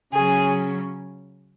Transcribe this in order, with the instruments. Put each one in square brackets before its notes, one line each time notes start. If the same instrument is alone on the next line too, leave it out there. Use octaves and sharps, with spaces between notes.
[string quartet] C#3 F#3 C#4 G#4